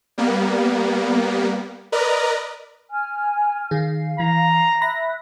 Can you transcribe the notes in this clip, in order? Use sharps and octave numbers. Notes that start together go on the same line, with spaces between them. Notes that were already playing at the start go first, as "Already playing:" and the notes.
G3 A#3 B3
A#4 B4 D5 D#5 A#5
G#5 F6
D#3 G#4 F5
E3 A#5
E5 B5 F#6 A#6